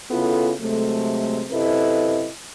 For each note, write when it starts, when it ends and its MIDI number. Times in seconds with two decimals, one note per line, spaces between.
0.10 0.52 49
0.10 0.52 59
0.10 0.52 64
0.10 0.52 65
0.10 0.52 69
0.61 1.45 48
0.61 1.45 54
0.61 1.45 56
0.61 1.45 57
1.51 2.29 42
1.51 2.29 48
1.51 2.29 64
1.51 2.29 69
1.51 2.29 71
1.51 2.29 75